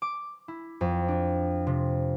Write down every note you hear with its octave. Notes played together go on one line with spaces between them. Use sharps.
D6
E4
F2
D4
C3